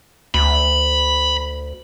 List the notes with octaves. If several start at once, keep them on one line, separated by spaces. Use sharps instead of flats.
D2 B5